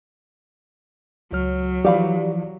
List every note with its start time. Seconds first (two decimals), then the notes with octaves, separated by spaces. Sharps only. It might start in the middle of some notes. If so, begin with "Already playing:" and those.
1.32 C#2 F#3 C#5 F6
1.85 E3 F3 G4 D5 F5 B5